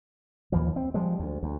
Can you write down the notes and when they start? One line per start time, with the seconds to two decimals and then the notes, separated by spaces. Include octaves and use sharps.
0.52 D#2 E3 F3
0.76 C4
0.94 F3 G3 G#3
1.19 D2
1.43 D2